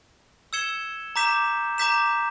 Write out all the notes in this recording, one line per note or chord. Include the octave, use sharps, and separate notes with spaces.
E6 G#6 C#7 E7 G7
A#5 D6 G6 B6 E7
A#5 D6 G6 B6 E7